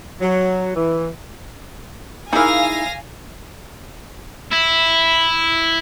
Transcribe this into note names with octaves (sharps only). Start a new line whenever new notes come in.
F#3
E3
A#3 D#4 E4 G#4 F5 G#5 A#6
E4